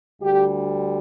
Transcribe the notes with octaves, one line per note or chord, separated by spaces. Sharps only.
D2 D3 G3 G4